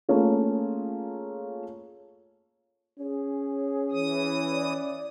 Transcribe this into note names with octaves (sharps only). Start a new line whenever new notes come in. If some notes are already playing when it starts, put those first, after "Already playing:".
A3 A#3 C#4 F4 G#4
C#4 G#4
E3 D#6
D5